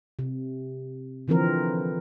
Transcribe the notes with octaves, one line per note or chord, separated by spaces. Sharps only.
C3
D3 E3 F3 C4 A#4